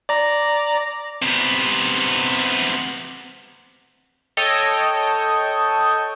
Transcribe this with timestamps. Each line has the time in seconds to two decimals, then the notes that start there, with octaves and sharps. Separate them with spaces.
0.09 D5 A#5
1.22 C3 B3
4.37 A4 C#5 D#5 G5